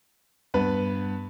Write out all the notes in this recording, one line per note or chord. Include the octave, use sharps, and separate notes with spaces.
G2 B3 B4